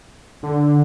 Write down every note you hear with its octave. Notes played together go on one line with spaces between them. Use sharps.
D3